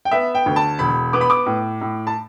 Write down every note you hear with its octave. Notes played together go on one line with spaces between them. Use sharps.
G5
B3 E5
G5
D2
A5
E1 B5
B3 D6
B5
D6
A2
A2
A5